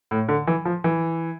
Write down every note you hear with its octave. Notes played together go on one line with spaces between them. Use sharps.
A2
D3
E3
F3
E3